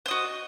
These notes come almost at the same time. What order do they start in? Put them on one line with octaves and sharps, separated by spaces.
C5 D#5 F#4